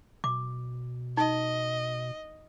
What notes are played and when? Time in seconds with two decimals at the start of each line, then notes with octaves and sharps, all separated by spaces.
0.24 B2 D6
1.17 D#4 D#5